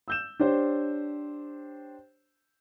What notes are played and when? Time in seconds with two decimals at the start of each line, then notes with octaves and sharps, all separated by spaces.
0.08 E6 G6 E7
0.39 D4 G4 C5 C#5